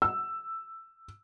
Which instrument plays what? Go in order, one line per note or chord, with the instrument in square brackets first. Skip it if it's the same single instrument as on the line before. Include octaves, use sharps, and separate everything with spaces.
[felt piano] E6